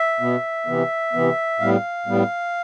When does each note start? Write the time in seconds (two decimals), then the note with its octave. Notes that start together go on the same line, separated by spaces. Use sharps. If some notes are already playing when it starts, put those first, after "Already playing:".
Already playing: E5
0.20 B2 B3
0.66 C3 E3 B3
1.13 C3 E3 B3
1.60 A2 G3 B3 F5
2.06 A2 G3 B3